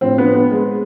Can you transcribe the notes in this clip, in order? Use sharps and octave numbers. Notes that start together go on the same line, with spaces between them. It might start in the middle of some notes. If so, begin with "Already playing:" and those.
A2 F3 C4
B3
B3
G#3